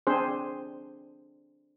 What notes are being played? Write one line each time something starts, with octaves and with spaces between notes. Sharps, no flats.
C4 D4 G#4 C5